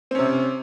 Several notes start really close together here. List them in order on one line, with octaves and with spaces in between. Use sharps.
C4 C#4 C3